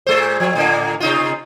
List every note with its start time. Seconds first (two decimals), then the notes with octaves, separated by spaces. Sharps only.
0.07 A#2 G#3 C5
0.40 F2 F3
0.55 A2 D3 A#3
1.00 C3 D#4 F4